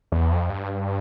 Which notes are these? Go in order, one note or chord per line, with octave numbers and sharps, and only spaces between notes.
E2
F2
G2